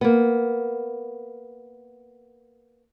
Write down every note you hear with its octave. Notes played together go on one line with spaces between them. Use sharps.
A#3 B3